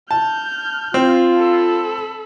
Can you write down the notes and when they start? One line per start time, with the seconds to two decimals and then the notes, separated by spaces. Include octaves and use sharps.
0.11 A5 F6 G6
0.94 C4 F4
1.37 A4 B5